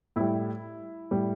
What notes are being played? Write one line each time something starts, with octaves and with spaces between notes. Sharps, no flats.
A2 G3 E4
A2 G3